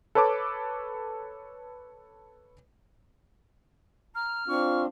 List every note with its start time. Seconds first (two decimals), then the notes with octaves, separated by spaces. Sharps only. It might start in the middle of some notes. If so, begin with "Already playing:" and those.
0.15 A4 B4 C#5 A5 D6
4.15 A#5 F6
4.48 C4 D4 F4 C#6